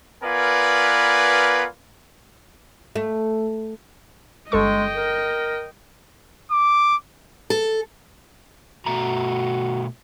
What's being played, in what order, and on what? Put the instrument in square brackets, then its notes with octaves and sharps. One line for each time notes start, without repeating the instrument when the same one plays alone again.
[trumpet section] B3 F4 A#4 B4 D5 G#5
[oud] A3
[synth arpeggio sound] G1 A4 C#6 [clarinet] G#3 [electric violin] D#5 G5
[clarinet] A#4
[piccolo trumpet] D6
[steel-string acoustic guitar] A4
[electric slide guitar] B2 A3 A#5 [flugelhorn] F#4